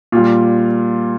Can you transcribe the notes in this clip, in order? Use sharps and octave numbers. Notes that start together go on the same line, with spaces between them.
A#2 G3 F4